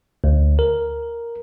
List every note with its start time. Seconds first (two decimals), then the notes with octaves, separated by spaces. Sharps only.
0.24 D2
0.59 A#4